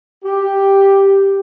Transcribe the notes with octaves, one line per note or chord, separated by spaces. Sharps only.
G4